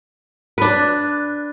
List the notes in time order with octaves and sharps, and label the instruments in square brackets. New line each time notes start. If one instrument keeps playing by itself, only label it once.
[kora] D4 B4